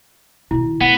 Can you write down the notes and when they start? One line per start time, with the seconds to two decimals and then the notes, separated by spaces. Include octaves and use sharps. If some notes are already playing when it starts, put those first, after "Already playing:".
0.51 B2 D#3 E4
0.81 A3 B3 F#5